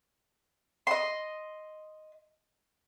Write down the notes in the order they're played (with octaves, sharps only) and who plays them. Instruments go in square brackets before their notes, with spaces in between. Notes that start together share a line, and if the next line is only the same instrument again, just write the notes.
[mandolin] D#5 C6